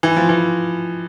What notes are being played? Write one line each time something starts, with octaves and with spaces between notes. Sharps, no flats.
E3
F3
E3